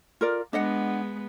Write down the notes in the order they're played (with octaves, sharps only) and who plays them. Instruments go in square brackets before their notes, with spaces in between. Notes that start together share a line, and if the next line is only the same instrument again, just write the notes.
[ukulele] F4 A#4 D5
[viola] G#3 B3 [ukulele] D4 D#5 F#5